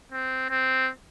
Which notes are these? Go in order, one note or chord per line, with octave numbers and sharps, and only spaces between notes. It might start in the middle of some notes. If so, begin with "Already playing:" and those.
C4
C4